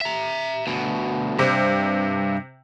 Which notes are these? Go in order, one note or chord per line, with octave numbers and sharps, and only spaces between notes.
E5 A#5
D2 B2
G2 C3